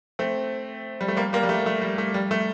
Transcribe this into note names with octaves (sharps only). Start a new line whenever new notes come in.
A3 C4
G3
A3
G3 A#3
G3 A#3
G3
A3
A3
G3
A3
G3
A3